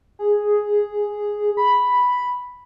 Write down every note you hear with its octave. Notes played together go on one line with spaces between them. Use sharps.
G#4
B5